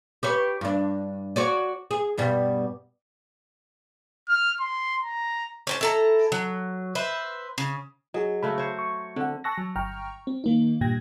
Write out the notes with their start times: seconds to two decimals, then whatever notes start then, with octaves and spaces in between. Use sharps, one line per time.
0.23 G4 B4 C#5
0.61 G2 D4
1.36 F#4 C#5 D5
1.91 G#4
2.18 G2 B2 G3
4.29 F6
4.60 C6
5.03 A#5
5.67 C#4 C5 A5
5.81 E4 A4 A#5
6.32 F#3
6.95 B4 C5 E5
7.58 C#3
8.14 F#3 G#4 D#5
8.43 C#3 A3 F#4 B5
8.58 C5 C#5
8.79 C#6
9.16 D3 C4 F#5
9.44 G#5 A5 C#6 E6 F#6 A#6
9.58 F#3
9.76 G1 G5 A#5 C#6 F6
10.27 C4
10.44 D#3 A#3 D#4
10.81 G2 A#2 G3 G5 G#6 A#6